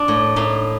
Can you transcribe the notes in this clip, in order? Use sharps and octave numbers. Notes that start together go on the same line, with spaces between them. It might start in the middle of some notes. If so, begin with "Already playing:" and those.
Already playing: D4
A2
A2 D#4